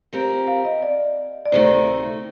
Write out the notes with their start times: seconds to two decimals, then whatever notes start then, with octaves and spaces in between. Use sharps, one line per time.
0.13 F3 C4 G4 A#4
0.48 F5
0.65 D#5
0.82 D5
1.45 D5
1.52 D2 C3 D#3 A3 C5